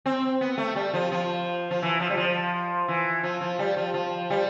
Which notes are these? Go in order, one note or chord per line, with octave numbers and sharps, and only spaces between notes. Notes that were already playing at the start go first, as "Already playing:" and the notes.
C4
B3
A3
G3
F3
F3
F3
E3
F3
G3
F3
E3
F3
F3
G3
F3
F3
G3